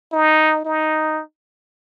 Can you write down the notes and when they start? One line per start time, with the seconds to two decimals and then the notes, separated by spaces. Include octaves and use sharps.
0.12 D#4
0.65 D#4